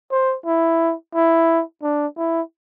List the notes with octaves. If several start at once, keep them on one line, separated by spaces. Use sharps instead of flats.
C5
E4
E4
D4
E4